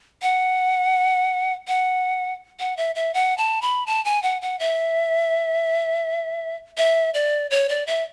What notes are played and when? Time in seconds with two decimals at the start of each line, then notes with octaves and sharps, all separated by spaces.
0.22 F#5
1.68 F#5
2.60 F#5
2.77 E5
2.95 E5
3.14 F#5
3.38 A5
3.62 B5
3.87 A5
4.05 G#5
4.23 F#5
4.42 F#5
4.59 E5
6.78 E5
7.14 D5
7.50 C#5
7.69 D5
7.87 E5